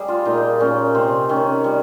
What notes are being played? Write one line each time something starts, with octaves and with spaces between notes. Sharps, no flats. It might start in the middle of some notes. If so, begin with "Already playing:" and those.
Already playing: G3 G#4
F4
A#2 D#4
A#2 C#4
C3 C4
D#3 C#4
G3